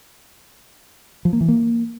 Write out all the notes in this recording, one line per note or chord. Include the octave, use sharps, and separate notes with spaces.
F3
A#3
E3
A#3